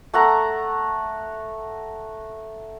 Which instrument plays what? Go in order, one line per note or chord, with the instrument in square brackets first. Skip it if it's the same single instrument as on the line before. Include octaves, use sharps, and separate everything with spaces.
[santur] A3 F#5 A#5